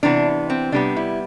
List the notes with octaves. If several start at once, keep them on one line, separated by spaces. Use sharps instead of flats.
C3 E3 B3 D4
C4
C3 G3 B3 D4
E4